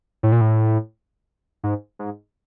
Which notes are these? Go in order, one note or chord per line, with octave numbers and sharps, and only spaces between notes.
A2
A#2
A2
G#2
G#2